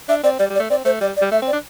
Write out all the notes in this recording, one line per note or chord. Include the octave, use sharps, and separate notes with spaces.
D4 E5
C4 D5
G3 D5
G3
D5
A3
C4 D5
A3 C5
G3 D5
D5
G3
A3 E5
C4
D5
D4